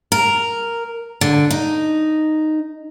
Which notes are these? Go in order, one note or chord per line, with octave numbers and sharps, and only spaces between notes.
A#4
D3
D#4